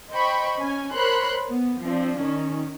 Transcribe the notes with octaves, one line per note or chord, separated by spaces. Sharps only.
C5 D#5 G5 B5 C#6
C#4 G#5
A#4 C5 C#5 B5 C6 F#6
B3
F3 C4 D4
D#3 C#4